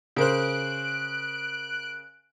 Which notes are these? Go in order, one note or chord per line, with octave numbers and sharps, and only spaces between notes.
C#3 A#4 C5 F#6 D7